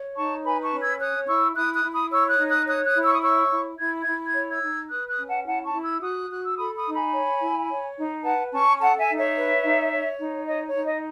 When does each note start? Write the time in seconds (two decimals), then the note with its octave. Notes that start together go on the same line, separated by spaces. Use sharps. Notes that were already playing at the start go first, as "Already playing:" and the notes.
Already playing: C#5
0.16 D#4 A5 C#6
0.44 B4 G#5 B5
0.62 A5 C#6
0.71 C#4
0.81 E6 G#6
0.99 C#5 D#6 F#6
1.27 E4 C#6 E6
1.55 E4 D#6 F#6
1.74 D#6 F#6
1.83 E4
1.92 B5 D#6
2.11 C#5 C#6 E6
2.30 D#6 F#6
2.39 D#4
2.48 D#6 F#6
2.67 C#5 D#6 F#6
2.85 D#6 F#6
2.95 E4
3.04 C#6 E6
3.14 D#6
3.22 C#5 C#6 E6
3.50 E4
3.78 E4 G#6
4.03 E4 G#6
4.27 G#6
4.34 C#5
4.50 E6 G#6
4.62 D#4
4.90 B4 D#6 F#6
5.08 D#6 F#6
5.18 C#4
5.27 F#5 A5
5.46 E4 F#5 A5
5.64 A5 C#6
5.74 E4
5.83 E6 G#6
6.01 F#4 D#6 F#6
6.30 F#4 F#6
6.44 E6
6.57 A4 B5 D#6
6.76 B5 D#6
6.85 D#4
6.94 G#5 B5
7.13 C#5
7.41 E4
7.69 C#5
7.97 D#4
8.24 B4 F#5 A5
8.52 C#4 A5 C#6
8.80 A4 F#5 A5
8.99 E5 G#5
9.08 D#4
9.17 C#5 E5
9.36 B4
9.64 D#4
9.92 C#5
10.19 D#4
10.48 C#5 D#5
10.66 C#5
10.75 D#4
10.85 D#5